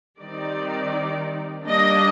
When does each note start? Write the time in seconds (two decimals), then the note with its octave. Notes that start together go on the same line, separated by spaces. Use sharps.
0.19 D#3 G3 C4 D#4 D5
1.65 G3 A#3 D4 D#5